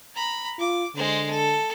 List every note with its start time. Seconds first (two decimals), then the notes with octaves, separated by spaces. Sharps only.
0.15 A#5 B5
0.59 F4 D6
0.95 D3 G#3 C5
1.30 A4